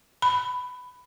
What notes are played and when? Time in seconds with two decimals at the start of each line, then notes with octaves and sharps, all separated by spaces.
0.22 B5